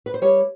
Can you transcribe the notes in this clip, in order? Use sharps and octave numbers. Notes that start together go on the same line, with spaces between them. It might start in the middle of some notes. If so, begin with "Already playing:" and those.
B4
C5
G3 C#5